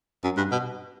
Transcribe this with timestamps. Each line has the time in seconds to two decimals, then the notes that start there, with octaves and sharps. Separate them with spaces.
0.24 F#2
0.37 G2
0.52 B2